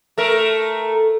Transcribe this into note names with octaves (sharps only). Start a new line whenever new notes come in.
A3 A#4